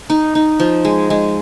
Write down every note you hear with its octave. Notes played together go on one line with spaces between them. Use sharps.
D#4
D#4
F3
G#3
G#3